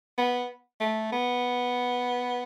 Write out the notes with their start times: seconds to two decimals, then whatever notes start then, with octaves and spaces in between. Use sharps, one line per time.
0.18 B3
0.81 A3
1.12 B3